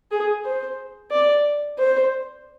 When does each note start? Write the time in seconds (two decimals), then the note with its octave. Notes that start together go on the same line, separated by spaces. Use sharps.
0.11 G#4
0.44 C5
1.11 D5
1.78 C5